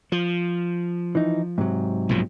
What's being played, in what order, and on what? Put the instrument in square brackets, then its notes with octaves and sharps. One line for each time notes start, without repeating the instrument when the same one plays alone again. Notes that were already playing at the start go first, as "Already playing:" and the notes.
[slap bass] F3
[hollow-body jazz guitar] E3 D#4
G#2 C3 F#3
[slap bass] B1 A#2 F3